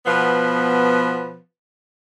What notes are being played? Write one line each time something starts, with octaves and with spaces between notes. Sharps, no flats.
B2 F3 B3 B4